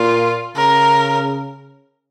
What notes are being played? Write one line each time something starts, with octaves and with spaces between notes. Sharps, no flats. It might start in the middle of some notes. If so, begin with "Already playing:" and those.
Already playing: A#2 F4
C#3 A#4